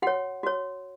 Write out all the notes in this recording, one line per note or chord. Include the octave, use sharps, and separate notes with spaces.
F#4 C#5 F#5
F#4 C#5